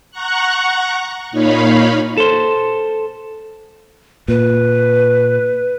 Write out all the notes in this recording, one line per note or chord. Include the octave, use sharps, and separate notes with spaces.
F#5 A#5 C#6 F#6
A#2 D#4 C#5 F5 B5
A4 C5
A#2 B4